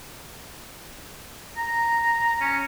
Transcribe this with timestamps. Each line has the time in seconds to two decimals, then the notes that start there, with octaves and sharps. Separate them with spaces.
1.57 A#5
2.41 C#4